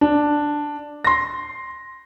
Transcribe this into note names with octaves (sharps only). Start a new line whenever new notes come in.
D4
C6 A#6